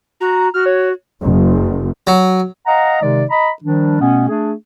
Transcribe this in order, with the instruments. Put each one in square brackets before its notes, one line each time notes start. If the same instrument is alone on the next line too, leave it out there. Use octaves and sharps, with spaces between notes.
[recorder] F#4 [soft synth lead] A#5
[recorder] F#4 [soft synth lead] F6
[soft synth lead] C#5
[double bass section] F#1
[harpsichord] F#3
[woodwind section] D#5 F5 F#5 A#5
C3 D#3 G#3 D#4 D5
D#5 A#5 B5
D#3 F3 G3 D4
B2 A3 B3 C#4
A3 D4 G#4